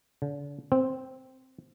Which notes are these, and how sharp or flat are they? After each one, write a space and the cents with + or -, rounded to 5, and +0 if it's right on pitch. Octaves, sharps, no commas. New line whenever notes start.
D3 -40
C4 -5